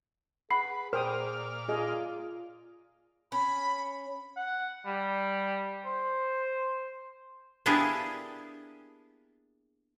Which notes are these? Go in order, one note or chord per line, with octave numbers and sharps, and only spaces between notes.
G#4 B4 F#5 B5 C7
A#2 A#4 C5 D5 G5 D#6 F6
F4 G#4 D#5
C#4 B5
F#5
G3
C5
A#3 B3 D4 E4 G4 G#4